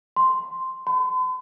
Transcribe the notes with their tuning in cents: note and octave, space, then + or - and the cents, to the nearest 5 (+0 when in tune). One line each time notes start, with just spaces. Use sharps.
C6 -5
C6 -45